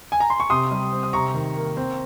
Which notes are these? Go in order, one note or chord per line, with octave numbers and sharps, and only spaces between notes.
G#5
A#5
C6
C#6
C3 C6 D#6
G3
C4
D#6
C3 A#5 C#6
D#3
A#3
C4